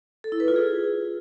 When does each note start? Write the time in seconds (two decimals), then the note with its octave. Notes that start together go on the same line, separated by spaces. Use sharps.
0.24 A4
0.32 E4
0.40 B4
0.48 F4
0.56 G#4